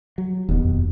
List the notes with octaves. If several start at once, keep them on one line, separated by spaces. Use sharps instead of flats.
F#3
E1 D#2 B2
F2